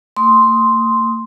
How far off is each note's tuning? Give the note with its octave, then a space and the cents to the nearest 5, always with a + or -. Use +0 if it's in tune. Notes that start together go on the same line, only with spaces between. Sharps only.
A#3 -45 C6 +0 D#6 +15